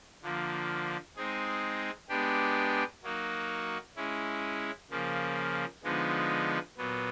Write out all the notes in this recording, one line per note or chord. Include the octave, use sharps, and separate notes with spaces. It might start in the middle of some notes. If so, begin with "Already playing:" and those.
D3 F3 A#3
G#3 C4 D#4 G#4
G#3 B3 D4 G4
F#3 A#3 D#4 F#4
G#3 C#4 E4
C#3 F3 A#3
D3 F3 G#3 B3 D#4
A#2 F#3 B3